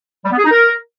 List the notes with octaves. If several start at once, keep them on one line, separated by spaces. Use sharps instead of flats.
G3
B3
G#4
D#4
A#4